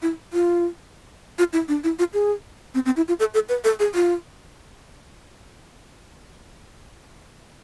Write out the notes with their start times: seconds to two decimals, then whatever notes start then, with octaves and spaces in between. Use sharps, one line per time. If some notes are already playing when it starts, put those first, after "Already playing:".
0.02 E4
0.33 F4
1.39 F4
1.53 E4
1.68 D4
1.84 E4
1.99 F4
2.13 G#4
2.75 C4
2.86 C4
2.97 E4
3.08 F4
3.20 A4
3.34 A4
3.49 B4
3.64 A4
3.80 G#4
3.95 F4